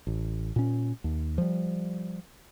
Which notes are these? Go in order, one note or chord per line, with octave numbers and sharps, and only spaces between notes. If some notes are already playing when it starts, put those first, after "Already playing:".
A1
A#2 C#4
D#2
F3 G3